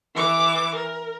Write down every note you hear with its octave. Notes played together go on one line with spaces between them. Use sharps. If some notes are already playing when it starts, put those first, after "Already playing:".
E3 D6
A#4